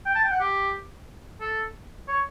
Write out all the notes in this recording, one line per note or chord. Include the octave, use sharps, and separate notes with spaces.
G5
A5
G5
F#5
G4
A4
C#5